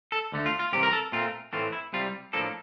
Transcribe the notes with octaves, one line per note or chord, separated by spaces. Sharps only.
A4
D2 D3 A3
F4
F4
C2 C3 E3 G4
A#4
A4
A#2 A3 C4 F4
A2 E3 A3 C4 F4
E4
C2 C3 G3 F4
A2 F3 A#3 D4 A4